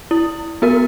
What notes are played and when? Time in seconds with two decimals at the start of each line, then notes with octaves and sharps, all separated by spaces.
0.11 E4
0.62 B3 F#4 A#4